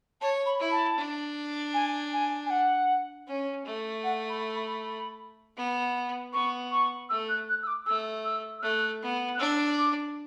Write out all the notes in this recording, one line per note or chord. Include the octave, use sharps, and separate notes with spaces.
C#5 A5
B5
E4
A5
D4
G#5
G#5
G#5
F#5
C#4
A3
F#5
B5
B5
B3
B3 C#6
C#6
A3 E6
F#6
F#6
E6
D6
A3 E6
E6
E6
A3 F#6
B3
F#6
D4 E6
D6